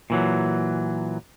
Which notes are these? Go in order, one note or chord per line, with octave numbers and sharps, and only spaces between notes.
A#2 E3 F#3